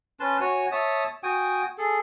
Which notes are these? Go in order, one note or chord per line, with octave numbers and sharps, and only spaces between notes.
C#4 B4 A5 C6
F#4 C#5 G#5
C#5 E5 A5 D#6
F#4 G5 G#5 D#6
G#4 A4